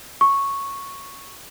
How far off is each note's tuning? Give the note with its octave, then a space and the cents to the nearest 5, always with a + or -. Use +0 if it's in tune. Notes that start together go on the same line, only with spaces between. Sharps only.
C#6 -5